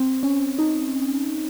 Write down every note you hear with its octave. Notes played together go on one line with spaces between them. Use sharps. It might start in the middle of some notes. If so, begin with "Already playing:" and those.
Already playing: C4
C#4
D#4